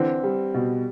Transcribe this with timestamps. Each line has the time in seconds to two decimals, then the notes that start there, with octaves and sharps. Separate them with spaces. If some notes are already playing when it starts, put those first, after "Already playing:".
Already playing: D3 E3 C4
0.23 G3
0.54 B2